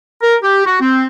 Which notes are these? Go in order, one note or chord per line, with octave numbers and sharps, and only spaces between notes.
A#4
G4
F#4
C4